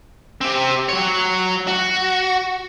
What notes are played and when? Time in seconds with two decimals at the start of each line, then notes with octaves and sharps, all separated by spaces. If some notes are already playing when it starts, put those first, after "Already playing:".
0.41 C4 G4
0.89 F#3 C#5
1.67 F#4